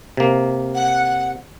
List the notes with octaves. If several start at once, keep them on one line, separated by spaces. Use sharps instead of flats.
C3 A#3
F#5